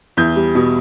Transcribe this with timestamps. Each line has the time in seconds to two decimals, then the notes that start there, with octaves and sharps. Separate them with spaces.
0.17 E2 G6
0.36 G3
0.55 B2